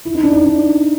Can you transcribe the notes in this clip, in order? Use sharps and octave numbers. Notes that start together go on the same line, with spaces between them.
E4
D#4
D4
D#4
D4